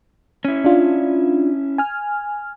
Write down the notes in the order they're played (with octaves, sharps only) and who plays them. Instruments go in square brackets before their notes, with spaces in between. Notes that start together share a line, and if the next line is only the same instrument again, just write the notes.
[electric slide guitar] C#4 E4
[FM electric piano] D4 F4
G#5 F6